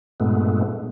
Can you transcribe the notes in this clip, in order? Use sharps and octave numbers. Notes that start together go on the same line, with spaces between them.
G2 A#2 G#3 A3 B3